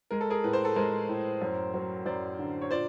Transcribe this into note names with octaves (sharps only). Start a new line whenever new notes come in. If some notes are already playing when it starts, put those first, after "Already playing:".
G#3 A#4
A4
G#4 A#4
A2 B4
C5
A4 B4
G#3 A#4 C5
A2
F#2
F#3
F#2 C5 D5
D3
C#5
A#2 C5 D5